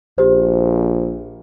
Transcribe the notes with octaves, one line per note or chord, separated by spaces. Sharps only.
A#1 G4 C5